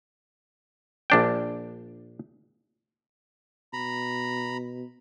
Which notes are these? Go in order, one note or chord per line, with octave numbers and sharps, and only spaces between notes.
A#1 D4 G5
B2 A#5 B5